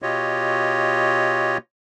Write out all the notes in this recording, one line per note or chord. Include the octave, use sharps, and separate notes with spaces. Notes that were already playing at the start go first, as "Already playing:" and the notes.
B2 F4 G4 C#5 D#5